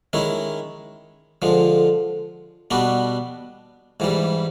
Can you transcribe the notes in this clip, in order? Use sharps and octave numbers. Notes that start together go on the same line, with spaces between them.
D#3 G#3 C#4 E4
D3 F3 G#3
B2 G3 B3 D4 F#4
G#2 E3 G3